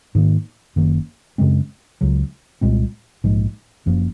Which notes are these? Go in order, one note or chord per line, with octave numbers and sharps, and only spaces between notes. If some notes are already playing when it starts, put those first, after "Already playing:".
G#2 D#3 A#3
F#1 F#2 D#3 A#3
F#2 C#3 G#3 C4
C#2 C#3 F#3
C2 A#2 G#3 C4
A#1 G#2 F3 G#3
F#1 F#2 F3 A#3